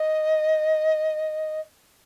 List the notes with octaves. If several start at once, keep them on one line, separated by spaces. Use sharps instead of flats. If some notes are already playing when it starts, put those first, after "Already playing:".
Already playing: D#5